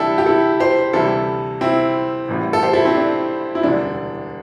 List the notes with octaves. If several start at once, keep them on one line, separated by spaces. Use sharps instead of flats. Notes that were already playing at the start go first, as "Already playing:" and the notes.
Already playing: D2 C3 E3 G3 D4 E4 G4 A4
G4
E4 A4
G4 C5
D2 C3 E3 G3 E4 A4
C4 E4
A1 A2 E3 G3
A4
G4 C5
E4 A4
C4 E4
D4
E4
E1 D2 D3 G3 D4